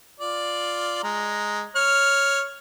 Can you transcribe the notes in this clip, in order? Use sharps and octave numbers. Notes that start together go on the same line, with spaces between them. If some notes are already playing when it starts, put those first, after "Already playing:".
F4 D5
G#3 A#5
C#5 F6